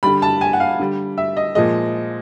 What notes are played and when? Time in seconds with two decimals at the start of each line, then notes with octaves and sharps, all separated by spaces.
0.03 D3 G3 B5
0.22 A5
0.41 G#5
0.53 F#5
0.60 F5
0.79 D3 G3
1.18 E5
1.37 D#5
1.55 A#2 F3 G#3 D#5